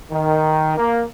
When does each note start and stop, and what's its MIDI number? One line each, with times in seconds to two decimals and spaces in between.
0.11 0.78 51
0.78 1.05 58